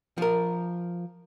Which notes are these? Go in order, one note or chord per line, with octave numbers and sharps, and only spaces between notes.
F3 A#4